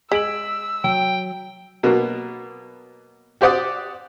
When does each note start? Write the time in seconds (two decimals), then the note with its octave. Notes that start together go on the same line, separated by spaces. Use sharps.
0.12 G#3 E6 B6 D7 F#7
0.84 F#3 G5
1.83 B2 F#3 A#3 B3
3.41 F#4 G4 C5 D5 F#5 D#6